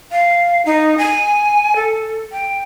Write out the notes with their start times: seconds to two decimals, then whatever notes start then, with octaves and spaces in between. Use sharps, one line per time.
0.11 F5
0.66 D#4
0.98 G#5
1.76 A4
2.32 G5